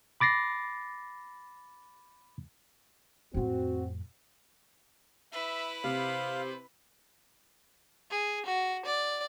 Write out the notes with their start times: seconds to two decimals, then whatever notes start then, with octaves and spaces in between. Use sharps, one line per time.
0.20 B5 D6 A6 A#6 C7
3.34 F2 A2 C4 F#4
5.32 E4 B4 E5
5.84 C3 C5 F5
8.10 G#4
8.46 F#4
8.85 D5